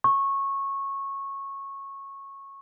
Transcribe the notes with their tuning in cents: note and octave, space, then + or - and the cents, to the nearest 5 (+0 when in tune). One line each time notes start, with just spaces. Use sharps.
C#6 -15